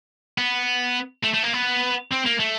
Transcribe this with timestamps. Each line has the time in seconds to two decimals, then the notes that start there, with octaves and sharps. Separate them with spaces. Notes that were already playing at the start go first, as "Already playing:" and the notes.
0.38 B3
1.24 A3
1.34 A3
1.44 A#3
1.54 B3
2.11 C4
2.25 A#3
2.39 A3